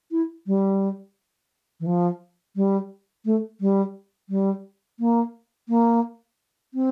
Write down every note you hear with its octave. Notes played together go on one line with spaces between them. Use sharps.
E4
G3
E3
F3
G3
A3
G3
G3
A#3
A#3
C4